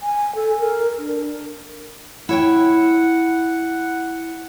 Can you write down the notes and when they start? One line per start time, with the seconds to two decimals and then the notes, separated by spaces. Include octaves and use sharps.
0.02 G#5
0.35 A4
0.59 A#4
0.98 D4
2.29 E4 C#5 F#5 G5